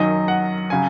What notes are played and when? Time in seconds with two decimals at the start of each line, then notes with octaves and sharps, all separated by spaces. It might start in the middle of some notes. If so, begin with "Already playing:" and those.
Already playing: F#2 D#3 F#3 D#5
0.28 F#5
0.70 C#3 F#3 G#5